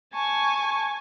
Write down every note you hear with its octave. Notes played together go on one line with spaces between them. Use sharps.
G#5 A5 C#6